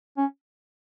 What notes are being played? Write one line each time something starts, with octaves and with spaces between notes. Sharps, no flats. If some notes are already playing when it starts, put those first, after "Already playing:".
C#4